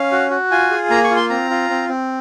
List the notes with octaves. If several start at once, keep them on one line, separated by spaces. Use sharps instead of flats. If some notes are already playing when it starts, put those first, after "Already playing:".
Already playing: C#4 F5
F#4
F#4
F4 G#5
G#4
A#3 A#5
C#6
F4
C6
C4 A#5
F4
C4
C4